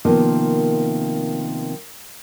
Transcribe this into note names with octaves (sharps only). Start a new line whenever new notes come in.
C3 D#3 F3 A#3 B3